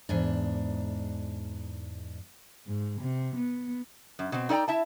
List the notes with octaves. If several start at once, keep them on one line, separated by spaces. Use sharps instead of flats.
E2 G#2 D4
G#2
C3
B3
F#2
B2 C4
D#4 A4 D5 G5 A#5
E4 E5 A5